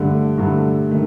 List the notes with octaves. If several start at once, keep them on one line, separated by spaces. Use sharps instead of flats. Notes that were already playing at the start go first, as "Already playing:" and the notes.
Already playing: G2 D3 A3
G2 D3 A3
D#3 A3